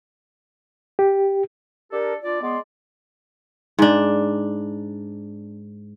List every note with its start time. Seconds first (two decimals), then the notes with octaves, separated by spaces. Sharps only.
0.99 G4
1.93 D4 G4 A4 A#4
2.23 D4 F4 D5
2.42 G#3 B3 D5 C6
3.79 G#2 D4